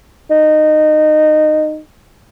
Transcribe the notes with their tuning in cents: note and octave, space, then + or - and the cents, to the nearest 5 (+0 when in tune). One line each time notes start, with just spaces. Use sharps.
D#4 -20